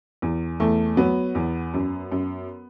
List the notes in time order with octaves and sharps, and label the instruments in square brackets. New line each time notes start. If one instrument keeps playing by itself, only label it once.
[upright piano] E2
E2 A3
F#3 B3
E2
F#2
F#2